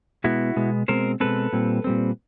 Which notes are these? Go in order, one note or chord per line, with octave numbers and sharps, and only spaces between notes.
B2 G#3 B3 E4 F#4
B2 G#3 B3
B2 G#3 C4 A#4 C5
B2 G#3 C4 A4 B4
A#2 G3 C4
A#2 G3 C4